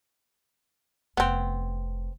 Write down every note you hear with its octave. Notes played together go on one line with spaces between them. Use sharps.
F1 B3 C4